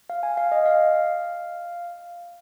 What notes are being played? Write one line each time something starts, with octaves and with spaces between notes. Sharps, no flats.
F5
G#5
F5
D#5
F5